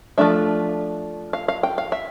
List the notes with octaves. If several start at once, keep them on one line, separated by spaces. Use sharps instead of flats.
F3 A3 D4 E5
F5
F5
G5
F5
E5